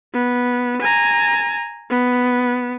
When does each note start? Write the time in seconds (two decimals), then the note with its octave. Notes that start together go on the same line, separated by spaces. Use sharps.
0.14 B3
0.81 G#5 A#5
1.90 B3